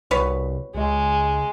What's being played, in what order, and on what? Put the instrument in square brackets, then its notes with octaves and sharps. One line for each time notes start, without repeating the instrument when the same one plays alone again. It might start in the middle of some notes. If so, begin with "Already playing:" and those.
[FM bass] C2 [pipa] B2 B4 C#5
[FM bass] C#2 [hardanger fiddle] G#3